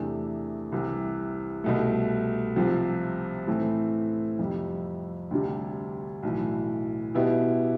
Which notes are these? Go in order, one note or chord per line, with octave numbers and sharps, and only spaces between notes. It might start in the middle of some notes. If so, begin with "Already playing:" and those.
Already playing: E2 C3 E3 A3 D4
C2 C3 E3
C2 B2 A3
C2 C3 F3 C4
A2 E3 A3 C4
F2 C3 G3
D2 C3 G3 D4
B1 A2 E3
B2 B3 E4 G4